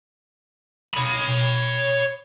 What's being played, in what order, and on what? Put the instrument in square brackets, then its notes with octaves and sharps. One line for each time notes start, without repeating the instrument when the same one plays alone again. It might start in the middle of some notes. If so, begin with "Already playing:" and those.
[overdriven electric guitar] C#5 B5